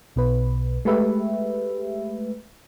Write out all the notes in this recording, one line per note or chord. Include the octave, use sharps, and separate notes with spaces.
B1 B2 B4
G#3 A3 G4 B4 E5